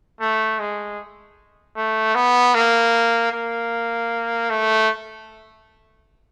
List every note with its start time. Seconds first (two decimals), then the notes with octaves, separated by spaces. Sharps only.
0.20 A3
0.59 G#3
1.76 A3
2.15 B3
2.54 A#3
3.32 A#3
4.50 A3